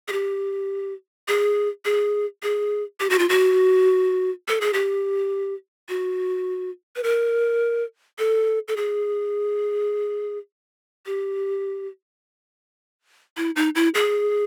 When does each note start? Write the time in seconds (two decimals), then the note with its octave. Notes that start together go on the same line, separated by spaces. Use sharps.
0.08 G#4
0.12 G4
1.28 G#4
1.85 G#4
2.43 G#4
3.00 G4
3.10 F#4
3.19 F4
3.29 F#4
4.48 A4
4.61 G#4
4.73 G4
5.89 F#4
6.96 B4
7.03 A#4
8.19 A4
8.68 A4
8.77 G#4
11.06 G4
13.37 E4
13.56 D#4
13.75 E4
13.95 G#4